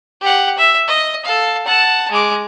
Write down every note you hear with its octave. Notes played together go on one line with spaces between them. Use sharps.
G4 F#5
E5
D#5
A4 F5
F#5 A5
G#3 D6